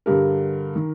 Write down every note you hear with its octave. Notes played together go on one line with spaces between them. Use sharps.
G2 D3 G4 A#4
D#3